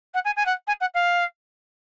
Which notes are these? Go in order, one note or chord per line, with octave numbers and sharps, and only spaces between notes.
F#5
G#5
G#5
F#5
G#5
F#5
F5